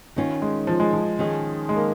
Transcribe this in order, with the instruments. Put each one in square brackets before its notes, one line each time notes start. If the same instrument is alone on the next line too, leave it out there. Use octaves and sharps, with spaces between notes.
[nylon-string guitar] D#3 C#4 F4
[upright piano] G#3
F3
G#3
F3
[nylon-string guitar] D#3 C#4 G#4
[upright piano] G#3
A#3